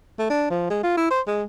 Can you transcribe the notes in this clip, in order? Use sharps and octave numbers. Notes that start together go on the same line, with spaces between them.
A3
D4
F3
G#3
F4
E4
C5
G#3